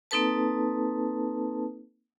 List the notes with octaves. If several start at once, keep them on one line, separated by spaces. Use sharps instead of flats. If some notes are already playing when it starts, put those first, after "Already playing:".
A#3 C4 D#4 A4 B4 A5